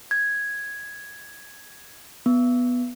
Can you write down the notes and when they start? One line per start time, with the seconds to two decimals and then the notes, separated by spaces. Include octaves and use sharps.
0.11 G#6
2.26 B3